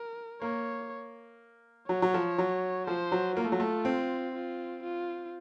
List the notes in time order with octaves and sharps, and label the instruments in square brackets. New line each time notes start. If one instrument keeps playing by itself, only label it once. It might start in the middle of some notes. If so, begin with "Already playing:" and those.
Already playing: [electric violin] A#4
[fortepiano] A#3 [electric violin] C#5
[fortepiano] F#3 [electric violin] C#5
[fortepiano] F#3
F3
F#3
[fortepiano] F3 [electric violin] C5
[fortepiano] F#3
[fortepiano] A#3 [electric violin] F4
[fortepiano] A3
F#3
A3
C4
[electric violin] F4
F4